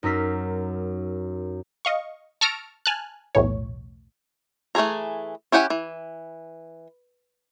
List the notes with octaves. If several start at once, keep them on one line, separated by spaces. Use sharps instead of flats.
F#2 D#4 A#4 E6 B6 C7
D#5 F5 C#6
A5 C#6 E6 F6 A#6 D7
G#5 A5 F6 F#6
B1 E2 A2 E3 C#5
E3 A3 C#4 G#4 A#5
C#4 E4 G4 F#5 G#5
E3